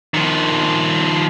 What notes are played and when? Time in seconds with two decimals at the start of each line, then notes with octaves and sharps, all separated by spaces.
0.14 D#3 F3